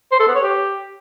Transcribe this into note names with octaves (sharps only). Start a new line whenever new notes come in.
C5
A4
B3
C#5
G4